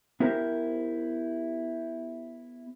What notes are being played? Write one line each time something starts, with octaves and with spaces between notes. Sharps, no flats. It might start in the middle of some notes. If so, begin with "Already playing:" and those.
B3 E4 G4 A#4 C5